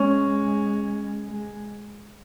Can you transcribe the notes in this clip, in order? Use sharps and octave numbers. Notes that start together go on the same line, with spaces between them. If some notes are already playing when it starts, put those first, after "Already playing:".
Already playing: G#3 C#4
G#3